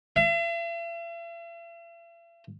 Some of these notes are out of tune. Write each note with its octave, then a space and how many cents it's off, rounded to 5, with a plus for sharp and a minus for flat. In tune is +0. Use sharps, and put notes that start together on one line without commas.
E5 +45